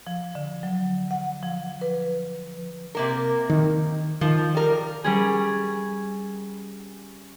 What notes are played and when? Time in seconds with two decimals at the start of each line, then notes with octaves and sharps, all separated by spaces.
0.07 F3
0.35 D3
0.63 F#3
1.11 F#5
1.43 F3
1.81 B4
2.95 C3 A#3 A#4
3.50 D#3
4.21 D#3 F3
4.55 G3 A#4
5.04 G3 C#4 G#4